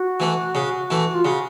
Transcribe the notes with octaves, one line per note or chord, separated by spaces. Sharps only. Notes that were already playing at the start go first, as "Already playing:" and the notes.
Already playing: F#4
E3 A3
C#3
E3 A3
F4
C#3 F#4